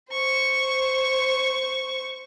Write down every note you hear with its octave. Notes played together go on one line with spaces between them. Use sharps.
C5 C#6